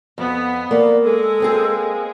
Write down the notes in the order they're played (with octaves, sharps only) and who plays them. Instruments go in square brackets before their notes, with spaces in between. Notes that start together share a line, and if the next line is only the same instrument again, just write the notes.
[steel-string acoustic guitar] F2 [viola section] B3
[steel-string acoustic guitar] A#3 [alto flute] D5
[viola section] G#3 [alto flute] A4
[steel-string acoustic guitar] A#3 C4 G#4